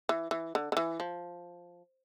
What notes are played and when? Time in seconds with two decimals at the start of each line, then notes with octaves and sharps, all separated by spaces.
0.09 E3
0.31 E3
0.55 D3
0.72 D3
0.77 E3
1.00 F3